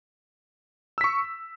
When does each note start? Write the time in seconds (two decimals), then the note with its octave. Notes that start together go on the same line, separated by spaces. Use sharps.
0.98 E6
1.01 B6
1.04 C#6